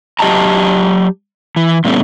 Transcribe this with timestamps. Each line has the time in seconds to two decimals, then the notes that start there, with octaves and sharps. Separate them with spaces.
0.19 F#3 G4 D#5 G5 A5 A#5
1.56 E3
1.85 A#2 D3 G3 A3 B3 C#4